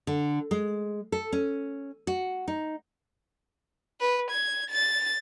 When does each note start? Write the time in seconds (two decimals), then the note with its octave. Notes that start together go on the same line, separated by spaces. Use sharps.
0.07 D3
0.51 G#3
1.12 A4
1.32 C#4
2.07 F#4
2.48 D#4
4.00 B4
4.31 G#6
4.70 A6